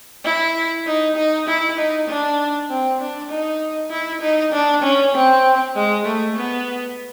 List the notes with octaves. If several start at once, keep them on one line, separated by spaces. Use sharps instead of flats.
E4
D#4
D#4
E4
D#4
D4
C4
D4
D#4
E4
D#4
D4
C#4
C4
G#3
A3
B3